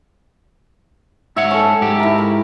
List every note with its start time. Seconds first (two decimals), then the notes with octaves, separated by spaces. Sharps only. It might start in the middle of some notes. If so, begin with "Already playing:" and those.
1.37 G#2 C#5 E5 F#5
1.51 C#4 A4
1.81 G#2 G4
2.00 E4 A#4
2.18 B5